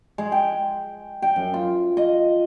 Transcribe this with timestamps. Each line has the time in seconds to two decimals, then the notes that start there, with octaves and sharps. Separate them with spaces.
0.18 G#3
0.32 G5
1.22 G5
1.36 F#2
1.54 F4
1.97 D#5